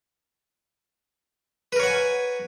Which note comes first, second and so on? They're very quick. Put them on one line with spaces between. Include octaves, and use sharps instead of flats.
B4 A#4 C#5 F#5 G#5